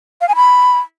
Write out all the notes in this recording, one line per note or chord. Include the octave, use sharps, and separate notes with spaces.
F5
G#5
B5